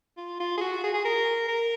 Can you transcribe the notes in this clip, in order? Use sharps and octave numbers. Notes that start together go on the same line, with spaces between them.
F4
F4
G#4
F#4
G#4
G#4
A#4
A#4